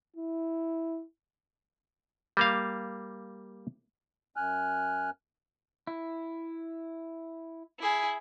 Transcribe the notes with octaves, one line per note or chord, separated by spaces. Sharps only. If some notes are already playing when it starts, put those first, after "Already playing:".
E4
G3 A#3 F5
F#2 G#5 F6 F#6
E4
E4 G#4